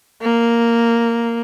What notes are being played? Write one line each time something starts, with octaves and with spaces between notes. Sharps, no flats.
A#3